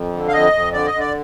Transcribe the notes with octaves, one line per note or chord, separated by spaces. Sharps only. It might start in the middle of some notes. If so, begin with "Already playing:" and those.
Already playing: F2
D3
F5
F2 D#5
F2
D3 D5
D#5
D3
D5